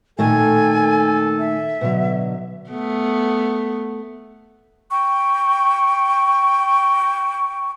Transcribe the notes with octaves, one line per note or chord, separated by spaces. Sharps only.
A#2 D#3 A3 A4 G#5
E5
B2 D3 F#3
A3 B3
G5 C#6